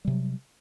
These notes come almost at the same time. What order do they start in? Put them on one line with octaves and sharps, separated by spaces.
G3 C3 F#3